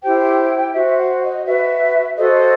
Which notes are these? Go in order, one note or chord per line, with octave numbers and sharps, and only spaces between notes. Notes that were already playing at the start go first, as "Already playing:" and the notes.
E4 G4 C5 G5
F#4 C5 E5
E5
F#5
D#5
F#4 B4 E5
F#4 A4 C5 D#5